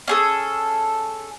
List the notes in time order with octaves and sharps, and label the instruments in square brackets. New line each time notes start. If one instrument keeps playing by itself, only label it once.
[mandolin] C#4 G#4 A4